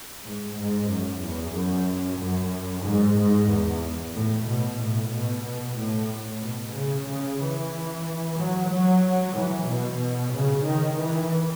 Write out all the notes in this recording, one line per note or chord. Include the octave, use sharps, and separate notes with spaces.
G#2
G#2
F#2
E2
F#2
F#2
G#2
G#2
E2
A2
B2
A2
B2
B2
A2
B2
C#3
C#3
E3
F#3
F#3
E3
B2
C#3
D#3
E3